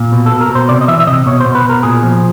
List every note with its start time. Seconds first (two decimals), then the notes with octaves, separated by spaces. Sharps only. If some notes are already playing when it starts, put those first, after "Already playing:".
Already playing: A#2
0.12 B2
0.26 A4
0.32 B2
0.41 A#4
0.50 B2
0.55 C5
0.69 C3 D5
0.81 D#5
0.88 E3 E5
1.00 E5
1.07 C3 D#5
1.26 B2 C#5
1.40 B2 C5
1.55 B4
1.65 B2 A#4
1.83 A#2 G#4
2.03 F3